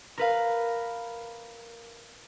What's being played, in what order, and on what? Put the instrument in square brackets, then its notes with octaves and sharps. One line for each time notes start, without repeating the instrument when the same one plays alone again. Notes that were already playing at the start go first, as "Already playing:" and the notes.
[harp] A#4 B4 F5